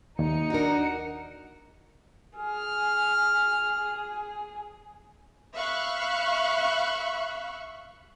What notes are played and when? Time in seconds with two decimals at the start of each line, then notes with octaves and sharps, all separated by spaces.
0.19 D#2 D#4 C#7
0.50 D4 F#4 A#4
2.36 G#4 F6
5.55 E5 F5 B5 C#6 F#6